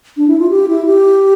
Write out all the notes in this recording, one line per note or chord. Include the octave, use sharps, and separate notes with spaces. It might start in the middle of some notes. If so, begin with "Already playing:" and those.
D4
E4
F4
G4
E4
G4